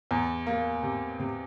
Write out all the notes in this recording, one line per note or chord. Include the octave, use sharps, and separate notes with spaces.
E2
A#3
C3
C3